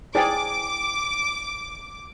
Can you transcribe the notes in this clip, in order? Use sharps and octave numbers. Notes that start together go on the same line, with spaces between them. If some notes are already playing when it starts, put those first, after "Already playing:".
E4 G#4 C5 D5 G5 D6